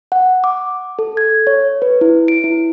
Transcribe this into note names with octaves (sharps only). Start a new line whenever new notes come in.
F#5
D6
A4
G#6
C#5
B4
E4
D7
E4